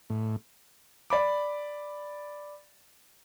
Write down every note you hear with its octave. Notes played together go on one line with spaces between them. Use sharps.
A2
D5 B5 D6